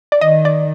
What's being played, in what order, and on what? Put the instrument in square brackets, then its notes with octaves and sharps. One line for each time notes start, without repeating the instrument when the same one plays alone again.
[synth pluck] D5
[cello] D#3 [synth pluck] D#5
[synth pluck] D5